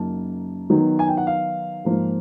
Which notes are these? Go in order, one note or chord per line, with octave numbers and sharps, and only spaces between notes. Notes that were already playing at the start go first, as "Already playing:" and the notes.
Already playing: F#2 C#3 F#3 A#3 D#4 A5
D#3 F#3 B3 D#4
G#5
G5
F#5
F5
G#2 F3 A#3